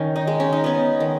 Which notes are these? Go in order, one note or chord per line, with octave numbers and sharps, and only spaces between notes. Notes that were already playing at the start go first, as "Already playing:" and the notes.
Already playing: D#3 C#4
D#4
G#3
C#4
D#4
B3 C#4
D#3